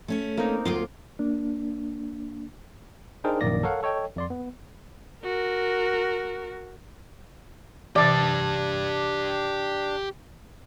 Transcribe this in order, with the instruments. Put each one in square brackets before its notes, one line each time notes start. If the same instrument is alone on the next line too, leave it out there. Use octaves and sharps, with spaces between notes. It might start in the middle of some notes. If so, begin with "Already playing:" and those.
[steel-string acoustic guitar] A3 C#4 C#5
[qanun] A#3 C4 D#4
[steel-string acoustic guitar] D2 F#3 F4 [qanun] C6 D6
[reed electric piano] A#3 D4
[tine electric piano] D4 D#4 G#4 A#4 C5 G5
A#1 F#2 D#3 A#3 D5 A#6
A4 A#4 C#5 F5 F#5
A4 C#5 D#5 G5
F2 D5 C6
B3
[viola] F#4 A#4
[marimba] C3 E3 [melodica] D4 [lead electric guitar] G4 A5 [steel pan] D5